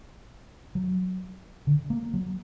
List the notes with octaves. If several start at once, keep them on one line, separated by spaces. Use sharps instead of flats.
F#3
D3
A#3
F#3